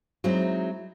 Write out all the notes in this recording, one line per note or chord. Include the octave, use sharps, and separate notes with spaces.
F#3 G#3 C4 D#4 E4